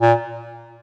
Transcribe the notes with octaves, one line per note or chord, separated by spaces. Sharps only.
A#2